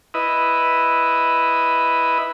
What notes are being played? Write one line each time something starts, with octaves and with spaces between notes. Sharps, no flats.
E4 B4 D#5